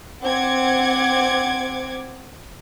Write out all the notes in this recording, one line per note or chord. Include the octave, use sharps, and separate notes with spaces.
C4 F#5 D6 G#6